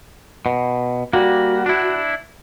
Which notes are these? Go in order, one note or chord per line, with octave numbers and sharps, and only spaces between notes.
B2
G3 A#3 F#4
D4 E4